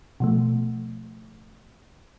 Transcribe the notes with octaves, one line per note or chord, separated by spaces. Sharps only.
B2 F3 A3